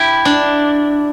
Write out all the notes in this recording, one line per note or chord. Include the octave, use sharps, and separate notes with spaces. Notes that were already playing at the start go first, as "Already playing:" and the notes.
Already playing: E4 G4
D4